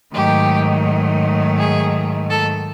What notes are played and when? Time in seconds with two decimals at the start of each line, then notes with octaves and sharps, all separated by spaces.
0.13 G#2 D#3 F#3 A3 G4
1.58 G#4
2.30 A4